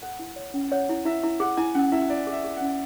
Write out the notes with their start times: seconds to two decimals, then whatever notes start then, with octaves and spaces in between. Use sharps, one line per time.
0.02 A4 F#5
0.19 E4
0.36 C#5
0.54 C#4
0.71 C#5 F#5
0.89 E4
1.05 E4 E5
1.23 E4
1.40 G#4 F#5
1.57 E4 G#5
1.75 C#4 F#5
1.92 E4 E5
2.09 E4 D5
2.27 G#4
2.32 E5
2.45 G#4
2.56 C#4 F#5